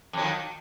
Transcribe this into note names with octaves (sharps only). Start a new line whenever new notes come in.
F2 D#3 F#3